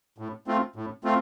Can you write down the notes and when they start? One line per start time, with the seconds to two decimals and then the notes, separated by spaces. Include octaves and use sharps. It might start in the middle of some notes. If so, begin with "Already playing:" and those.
0.18 A2
0.47 A3 C4 F4
0.76 A2
1.04 A3 C4 F4